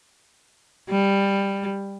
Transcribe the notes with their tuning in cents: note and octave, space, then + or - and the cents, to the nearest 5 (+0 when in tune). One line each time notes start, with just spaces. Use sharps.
G3 +10